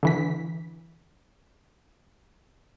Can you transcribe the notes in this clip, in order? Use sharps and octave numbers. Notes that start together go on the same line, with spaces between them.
D3 E3 B6